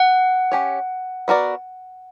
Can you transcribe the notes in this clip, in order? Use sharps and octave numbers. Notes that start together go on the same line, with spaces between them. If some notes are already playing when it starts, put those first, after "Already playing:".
Already playing: F#5
C#4 G4 C#5
B3 F#4 A#4 D5